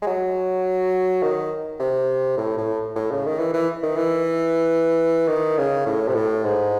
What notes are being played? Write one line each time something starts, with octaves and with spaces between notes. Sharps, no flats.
G#3
F#3
D#3
C3
A2
A2
A2
C#3
D#3
E3
E3
D#3
E3
D#3
C#3
A2
C3
A2
G#2